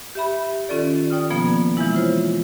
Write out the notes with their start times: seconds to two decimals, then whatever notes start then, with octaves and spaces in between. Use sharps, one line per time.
0.15 G4 E5 B5
0.69 D#3 C#4 F4 A4 D5
1.10 D5 G5 D#6 F6
1.30 B2 F3 A#3 B3
1.77 E3 F3 G#3 E4
1.95 F4 C5 C#5